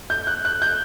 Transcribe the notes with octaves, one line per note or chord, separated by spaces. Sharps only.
G6
F#6
F#6
G6